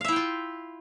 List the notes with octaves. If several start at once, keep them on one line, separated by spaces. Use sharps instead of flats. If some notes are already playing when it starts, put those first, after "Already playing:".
E4 F4 E5 F5 G5